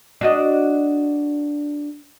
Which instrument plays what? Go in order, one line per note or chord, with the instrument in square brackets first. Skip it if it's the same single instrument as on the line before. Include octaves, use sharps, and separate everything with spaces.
[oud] D4 F#4 D#5